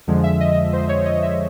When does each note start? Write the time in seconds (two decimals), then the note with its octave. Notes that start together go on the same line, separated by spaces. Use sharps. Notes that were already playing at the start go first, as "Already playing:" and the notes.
0.07 F2 D3 F3 G#3
0.24 E5
0.41 D#5
0.73 C5
0.89 C#5
1.06 D#5
1.23 E5